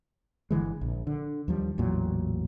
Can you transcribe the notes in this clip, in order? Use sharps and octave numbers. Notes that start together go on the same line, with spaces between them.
G1 D3 E3 G#3
A#1
D3
D#2 F3 G3
A1 E2 A#2 F#3